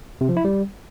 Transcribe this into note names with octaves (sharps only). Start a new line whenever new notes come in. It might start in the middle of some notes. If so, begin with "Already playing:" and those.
C3
F3
E4
G3